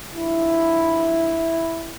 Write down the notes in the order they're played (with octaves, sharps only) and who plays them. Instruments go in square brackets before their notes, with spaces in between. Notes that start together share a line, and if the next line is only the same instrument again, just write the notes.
[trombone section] G2 F3 E4